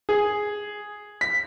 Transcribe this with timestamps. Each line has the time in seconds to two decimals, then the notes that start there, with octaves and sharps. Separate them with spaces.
0.09 G#4
1.21 B6